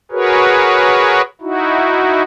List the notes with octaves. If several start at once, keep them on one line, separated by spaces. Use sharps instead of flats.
F#4 G#4 A#4 B4 C#5
D#4 E4 F#4